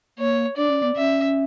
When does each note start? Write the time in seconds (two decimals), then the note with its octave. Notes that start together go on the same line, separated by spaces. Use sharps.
0.18 A#3 C#5
0.56 D4 D5
0.70 C#4
0.83 B3
0.96 C#4 E5